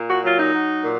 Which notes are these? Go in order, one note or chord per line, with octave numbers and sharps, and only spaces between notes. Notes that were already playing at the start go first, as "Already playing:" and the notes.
Already playing: A#2
F#4
F#3 F4
D#4
F#3
A#2